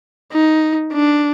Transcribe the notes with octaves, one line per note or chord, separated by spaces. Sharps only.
D#4
D4